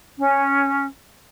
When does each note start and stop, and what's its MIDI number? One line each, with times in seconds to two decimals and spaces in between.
0.18 0.86 61